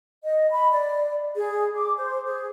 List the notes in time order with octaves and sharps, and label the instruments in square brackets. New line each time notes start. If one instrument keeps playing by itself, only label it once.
[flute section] D#5
B5
D5
G#4
D6
C5
G#4